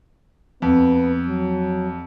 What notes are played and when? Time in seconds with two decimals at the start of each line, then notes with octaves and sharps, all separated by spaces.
0.62 F2 B3
1.28 F#3